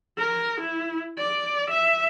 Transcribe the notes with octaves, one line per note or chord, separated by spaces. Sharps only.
A#4
E4
D5
E5